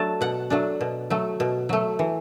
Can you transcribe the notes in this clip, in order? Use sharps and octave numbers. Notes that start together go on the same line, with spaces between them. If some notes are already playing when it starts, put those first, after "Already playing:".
Already playing: F#3 A3 D4 A5
B2 F#5
F#3 A3 D4
B2
F#3 A3
B2
F#3 A3
E3